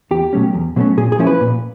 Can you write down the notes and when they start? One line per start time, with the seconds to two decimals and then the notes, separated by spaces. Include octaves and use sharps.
0.11 E2 G4
0.33 B2 F#3 A3 C#4
0.54 E2
0.76 B2 F#3 A3 C#4
0.97 A#2 G#4
1.12 G#4
1.19 F3 A#3 C#4 E4
1.27 B4
1.41 A#2